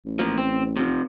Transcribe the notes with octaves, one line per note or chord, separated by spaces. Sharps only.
A1
A#2 F3
C4
C3 F3